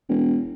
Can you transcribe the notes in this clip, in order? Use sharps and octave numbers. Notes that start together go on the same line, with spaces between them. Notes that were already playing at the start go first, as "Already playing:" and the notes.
E1